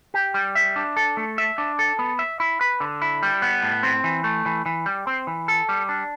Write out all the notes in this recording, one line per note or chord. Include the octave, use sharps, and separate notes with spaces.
G4
G3
E5
D4
A4
A3
E5
D4
A4
B3
E5
E4
B4
D3
E4
G3
B3
A2
C4
E3
A3
E3
E3
G3
C4
E3
A4
G3
D4